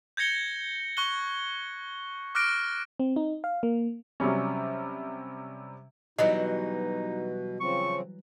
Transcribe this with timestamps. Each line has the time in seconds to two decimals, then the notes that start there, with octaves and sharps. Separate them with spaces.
0.17 G6 G#6 A#6 C#7 G7
0.97 C#6 F#6 G7
2.35 D6 F6 F#6 A#6 D7
3.00 C4
3.16 D#4
3.44 F5
3.63 A#3
4.20 C3 F#3 G3 C#4
6.19 B2 E3 F#3 G3 D#4 D#5
7.60 C#3 F3 C4 C#6